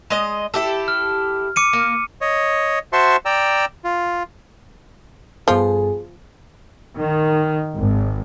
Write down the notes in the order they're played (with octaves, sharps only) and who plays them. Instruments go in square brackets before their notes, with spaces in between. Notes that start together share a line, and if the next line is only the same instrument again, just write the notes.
[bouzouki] G#3 D#5
E4 G4 A4
[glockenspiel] F6
D6 C#7 D#7
[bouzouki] A#3
[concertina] C#5 D#5
F#4 C5 E5 A5 C6 C#6
D5 G5 A#5 E6
F4
[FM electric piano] G2 B3 A4 [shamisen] F3 [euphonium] G#4
[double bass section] D#3
G#1